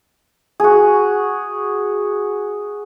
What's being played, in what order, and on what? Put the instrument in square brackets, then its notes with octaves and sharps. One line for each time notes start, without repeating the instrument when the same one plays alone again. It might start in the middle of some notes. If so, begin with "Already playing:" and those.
[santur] F#4 G#4